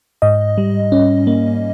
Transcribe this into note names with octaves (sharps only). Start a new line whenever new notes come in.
G#2 D#5
G3
C#4
A#3